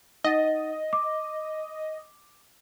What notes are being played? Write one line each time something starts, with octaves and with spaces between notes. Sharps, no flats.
D#4 D#5 F#5 A6
D6